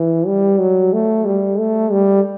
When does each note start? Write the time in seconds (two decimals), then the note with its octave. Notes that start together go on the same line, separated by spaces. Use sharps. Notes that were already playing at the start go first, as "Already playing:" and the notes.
Already playing: E3
0.27 G3
0.59 F#3
0.93 A3
1.25 G3
1.58 A3
1.91 G3